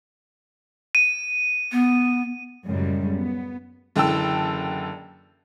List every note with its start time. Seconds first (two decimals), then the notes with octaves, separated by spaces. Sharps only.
0.95 D#7
1.72 B3
2.66 F#2 A2 C#3 G3 G#3
3.14 B3
3.96 F#1 D3 E3 G5 A5 E6